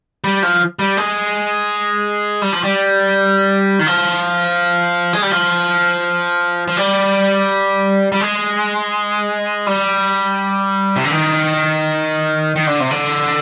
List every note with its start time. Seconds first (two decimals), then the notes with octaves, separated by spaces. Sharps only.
0.24 G3
0.43 F3
0.79 G3
0.97 G#3
2.42 G3
2.53 F3
2.64 G3
3.79 D#3
3.87 F3
5.13 G#3
5.22 G3
5.32 F3
6.68 F3
6.77 G3
8.12 G3
8.21 G#3
9.67 G3
10.96 C3
11.04 D3
11.11 D#3
12.56 D#3
12.67 D3
12.80 C3
12.91 D3